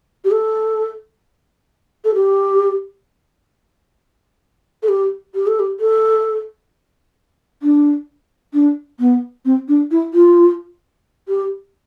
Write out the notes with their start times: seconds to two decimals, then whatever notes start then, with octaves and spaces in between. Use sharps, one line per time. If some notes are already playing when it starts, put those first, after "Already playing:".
0.25 G4
0.31 A4
2.05 A4
2.15 G4
4.83 A4
4.88 G4
5.35 G4
5.47 A4
5.59 G4
5.80 A4
7.63 D4
8.54 D4
9.00 B3
9.45 C4
9.68 D4
9.91 E4
10.14 F4
11.28 G4